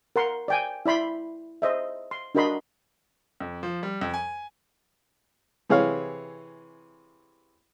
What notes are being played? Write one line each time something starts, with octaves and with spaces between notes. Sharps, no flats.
A#4 F#5 C6
D5 G5 G#5
E4 D5 B5 C6
C5 D#5 E5
C6
D4 F#4 A#4 D#5 B5 C6
F2
F3
G3
F2
G#5
C3 E3 G#4 C#5 F5